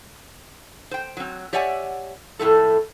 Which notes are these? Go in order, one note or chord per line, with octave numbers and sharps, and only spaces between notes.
C5 G5
F#3 C4
G4 C#5 D5 E5 F#5 G#5
F2 A2 A3 A4